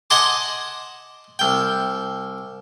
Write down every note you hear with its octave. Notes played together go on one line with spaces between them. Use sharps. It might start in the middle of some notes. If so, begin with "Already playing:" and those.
D#5 F#5 G#5 A5 C6 D6
C2 G5